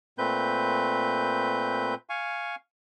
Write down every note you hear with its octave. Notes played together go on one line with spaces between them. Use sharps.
A#2 A3 C4 B4 G6
F5 G#5 C#6